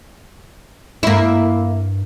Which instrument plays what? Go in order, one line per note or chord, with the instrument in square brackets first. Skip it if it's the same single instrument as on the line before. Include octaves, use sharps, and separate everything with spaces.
[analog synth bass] G2 [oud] A#3 E4